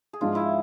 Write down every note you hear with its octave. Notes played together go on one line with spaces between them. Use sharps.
G#4
G#2 F3 G#3 D4 F4
E4